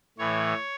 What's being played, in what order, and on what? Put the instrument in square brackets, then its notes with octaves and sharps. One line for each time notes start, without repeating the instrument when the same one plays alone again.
[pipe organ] A2 E3 C#5